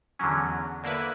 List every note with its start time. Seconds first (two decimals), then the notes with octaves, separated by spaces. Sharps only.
0.19 E2 D3 F#3 C#4
0.83 D3 A#3 E4 B4